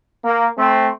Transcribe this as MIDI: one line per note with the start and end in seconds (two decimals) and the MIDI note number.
0.24 0.46 58
0.58 0.89 57
0.58 0.89 60